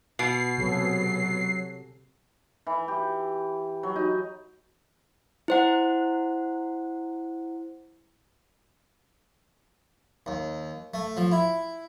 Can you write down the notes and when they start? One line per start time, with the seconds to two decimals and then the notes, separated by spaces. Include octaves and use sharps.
0.19 B2 C7
0.58 C3 F#3 G#4 A4
2.67 E3
2.88 G4
3.83 F#3
3.96 D#4
5.48 E4 C5 F#5
10.26 D#2
10.94 A3
11.17 F3
11.32 E4